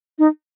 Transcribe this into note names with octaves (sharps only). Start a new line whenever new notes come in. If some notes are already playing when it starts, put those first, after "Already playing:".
D#4